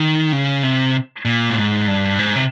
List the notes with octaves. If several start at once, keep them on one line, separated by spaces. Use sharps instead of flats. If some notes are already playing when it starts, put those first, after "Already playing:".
Already playing: D#3
C#3
C3
A#2
A2
G#2
G2
G#2
C3